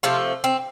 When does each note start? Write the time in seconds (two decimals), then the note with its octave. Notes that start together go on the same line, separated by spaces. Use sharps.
0.03 C3 F3 A3 F4
0.44 C4